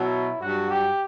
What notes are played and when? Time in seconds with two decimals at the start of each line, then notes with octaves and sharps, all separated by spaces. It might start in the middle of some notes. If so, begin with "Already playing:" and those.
Already playing: B2 F#3 E4
0.40 G2 F#3 F#4
0.70 G4